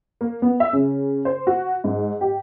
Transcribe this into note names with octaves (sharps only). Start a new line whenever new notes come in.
A#3
B3
E5
C#3
C5
F#4
G#2
G4